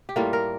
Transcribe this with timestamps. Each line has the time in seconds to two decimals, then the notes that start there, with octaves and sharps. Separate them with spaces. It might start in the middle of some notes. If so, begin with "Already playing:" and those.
0.09 G4
0.16 A2 G3 A#3 F4
0.33 A#4